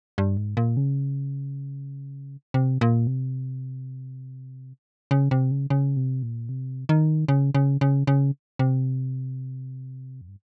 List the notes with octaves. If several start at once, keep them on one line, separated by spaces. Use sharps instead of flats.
G2
G#2
A#2
C#3
C3
A#2
C3
C#3
C3
C#3
C#3
C3
A#2
C3
D#3
C#3
C#3
C#3
C#3
C3
F2
G2